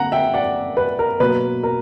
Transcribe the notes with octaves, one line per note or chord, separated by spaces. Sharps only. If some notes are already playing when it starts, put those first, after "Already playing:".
Already playing: D3 A#3 F#5 A#5
E5 G5
D5 F#5
B4
A#4
B2 F#3 A#3 B4
A#4